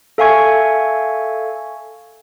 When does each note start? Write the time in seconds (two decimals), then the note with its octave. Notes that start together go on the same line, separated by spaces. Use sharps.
0.18 A4 E5 F5 G#5 C#6 G#6